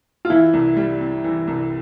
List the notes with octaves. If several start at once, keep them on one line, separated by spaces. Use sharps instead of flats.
F4
E3 E4
C2
G3
C3
E3
C2